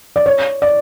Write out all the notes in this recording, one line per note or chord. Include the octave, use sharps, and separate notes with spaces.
D5
C#5
D5